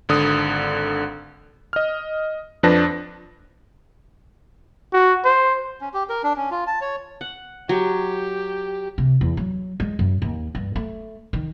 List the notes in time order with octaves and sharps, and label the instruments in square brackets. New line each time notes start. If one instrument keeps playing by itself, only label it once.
[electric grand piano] G#1 D3 D#6
D#5 F6
F2 F3 D4 B4 A5 A#6
[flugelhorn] F#4
C5
[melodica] C#4
G4
A#4
D4
C#4
F4
A5
C#5
[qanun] F#5
[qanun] F#3 [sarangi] G4
[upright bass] C3
E2
F#3
G#3
F#2
D#2
G2
A3
D#3